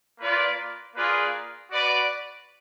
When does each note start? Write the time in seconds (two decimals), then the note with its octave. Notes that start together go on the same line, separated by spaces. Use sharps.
0.20 A#3 F4 B4 D5
0.95 A#3 F4 G#4 B4 D5
1.71 F#4 B4 D5